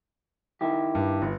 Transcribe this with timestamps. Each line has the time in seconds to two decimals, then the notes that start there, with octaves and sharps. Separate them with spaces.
0.61 D#3 E4 G4
0.95 G2
1.22 G1